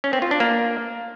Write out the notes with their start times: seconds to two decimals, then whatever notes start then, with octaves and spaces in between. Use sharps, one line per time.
0.04 C#4
0.13 C4
0.22 F4
0.31 D4
0.40 A#3